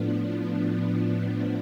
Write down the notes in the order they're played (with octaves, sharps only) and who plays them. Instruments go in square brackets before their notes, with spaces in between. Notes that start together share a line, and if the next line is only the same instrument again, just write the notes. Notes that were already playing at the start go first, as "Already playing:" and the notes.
Already playing: [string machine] A2 F3 B3 D4